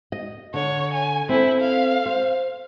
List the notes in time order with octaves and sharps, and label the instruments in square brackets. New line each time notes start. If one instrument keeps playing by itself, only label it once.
[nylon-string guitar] D#5
[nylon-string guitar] D3 [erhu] C#5
[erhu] G#5
[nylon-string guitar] C4 A4 [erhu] E4
[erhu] F5
[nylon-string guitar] C5